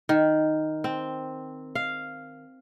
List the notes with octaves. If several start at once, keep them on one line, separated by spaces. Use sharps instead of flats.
D#3
C4
F5